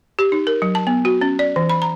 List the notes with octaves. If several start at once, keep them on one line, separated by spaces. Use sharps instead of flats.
G4
D#4
A#4
F#3
A5
B3
F#4
C#4
D5
E3
B5
A#5